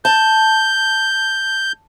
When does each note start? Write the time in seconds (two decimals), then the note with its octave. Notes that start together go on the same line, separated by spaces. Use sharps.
0.05 A5 G6